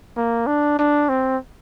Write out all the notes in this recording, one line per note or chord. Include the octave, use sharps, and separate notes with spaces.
A#3
D4
D4
C4